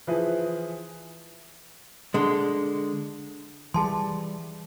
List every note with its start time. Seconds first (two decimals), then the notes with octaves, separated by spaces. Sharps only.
0.07 E3 F3 E4 G#4 B4
2.14 D3 G#3
3.74 E3 G3 G#4 A5 C6